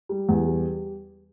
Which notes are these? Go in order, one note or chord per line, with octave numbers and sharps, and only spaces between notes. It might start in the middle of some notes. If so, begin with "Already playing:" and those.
G3
E2
G3